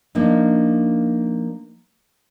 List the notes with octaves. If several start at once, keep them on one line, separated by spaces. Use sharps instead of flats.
F3 A#3 D4 D#4